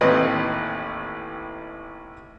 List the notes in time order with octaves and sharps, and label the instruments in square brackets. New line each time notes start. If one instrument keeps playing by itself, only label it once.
[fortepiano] A1 D#2 C4 B4 D#5